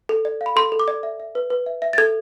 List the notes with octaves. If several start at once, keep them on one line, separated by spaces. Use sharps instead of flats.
A4
D5
F5
B5
A4 C6
A4
D6
D5
E5
E5
B4
B4
E5
E5
A6
A4 G#6